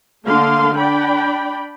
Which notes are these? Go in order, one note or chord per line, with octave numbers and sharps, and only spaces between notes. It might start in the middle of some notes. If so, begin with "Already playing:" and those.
D3 A3 A#3 F5 C6
D4 D5 G5 B5